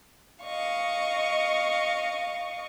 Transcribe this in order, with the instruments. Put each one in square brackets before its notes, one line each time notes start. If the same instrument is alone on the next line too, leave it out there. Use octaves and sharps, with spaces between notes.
[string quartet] D#5 F5 C#6